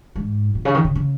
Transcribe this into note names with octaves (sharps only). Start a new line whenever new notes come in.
G#2
A#2
C#3
D#3
C#3
C#3